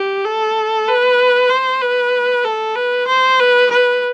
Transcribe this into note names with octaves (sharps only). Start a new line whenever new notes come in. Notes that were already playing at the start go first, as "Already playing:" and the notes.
Already playing: G4
A4
B4
C5
B4
A4
B4
C5
B4
B4